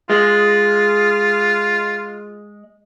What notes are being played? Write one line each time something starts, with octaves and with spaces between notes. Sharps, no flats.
G#3 F4